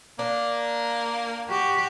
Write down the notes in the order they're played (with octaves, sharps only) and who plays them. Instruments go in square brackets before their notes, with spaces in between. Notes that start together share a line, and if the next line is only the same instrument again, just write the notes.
[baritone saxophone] A#3 [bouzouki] D4
[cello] F#4 G4